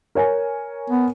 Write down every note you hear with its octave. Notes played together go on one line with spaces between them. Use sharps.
A#4 C#5 G#5
B3